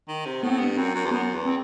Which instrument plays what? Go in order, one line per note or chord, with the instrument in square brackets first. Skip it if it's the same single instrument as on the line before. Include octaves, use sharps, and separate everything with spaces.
[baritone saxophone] D#3
C3
[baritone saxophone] A2 [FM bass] B3
[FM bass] C4
[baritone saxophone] G2 [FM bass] B3
[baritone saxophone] F#2 [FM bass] C4
[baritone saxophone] F#2
E2
[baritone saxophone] F#2 [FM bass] B3
[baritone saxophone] E2
[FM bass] C4